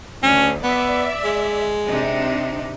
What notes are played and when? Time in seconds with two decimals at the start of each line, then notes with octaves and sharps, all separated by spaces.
0.23 D2 C#4
0.64 B3 D5 E5
1.24 G#3
1.87 C3 D4 D#4